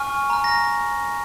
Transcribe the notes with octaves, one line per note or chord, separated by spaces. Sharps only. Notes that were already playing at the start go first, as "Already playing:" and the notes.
Already playing: G#5 C#6 F6
A#5 F6
A#6